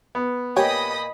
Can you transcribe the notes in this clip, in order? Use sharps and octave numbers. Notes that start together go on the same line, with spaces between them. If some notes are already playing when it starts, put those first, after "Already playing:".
B3
A#2 G4 C#5 D#5 G5 G#5 B5 D#6